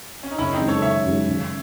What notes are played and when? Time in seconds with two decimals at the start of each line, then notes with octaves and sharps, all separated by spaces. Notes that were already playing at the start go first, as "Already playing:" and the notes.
0.23 C#4
0.31 D#4
0.38 F#1 C#4 E4
0.53 C4 D#4
0.61 F#2 D#3 G#3 C#4
0.68 A4 C#5
0.82 F#1 C#5 E5
1.04 F#2 D#3 G#3 C#4
1.27 C#3